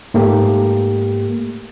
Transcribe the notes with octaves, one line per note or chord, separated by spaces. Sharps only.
G#2 A3 A#3 G4